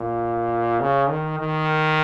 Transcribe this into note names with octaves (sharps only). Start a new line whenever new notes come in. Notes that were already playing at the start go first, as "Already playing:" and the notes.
Already playing: A#2
C#3
D#3
D#3